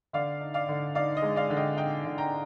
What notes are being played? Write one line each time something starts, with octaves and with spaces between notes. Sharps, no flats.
D3 D5 F5
D#4
D5 F5
D3
D#4 D5 F5
D#5
G#3
D5 F5
D3
D#5 G5
D#4 D#5 G5
D3
G5 A#5